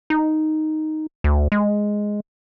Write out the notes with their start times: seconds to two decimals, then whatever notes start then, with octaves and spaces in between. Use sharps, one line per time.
0.10 D#4
1.24 D2
1.52 G#3